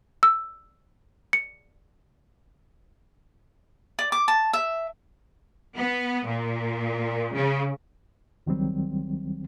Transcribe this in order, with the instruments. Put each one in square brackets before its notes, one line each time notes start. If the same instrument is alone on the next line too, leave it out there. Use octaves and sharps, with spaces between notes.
[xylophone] E6
C#7
[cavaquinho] D5
D6
A5
E5
[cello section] B3
A#2
C#3
[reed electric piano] C#2 D#3 F#3 G3 C4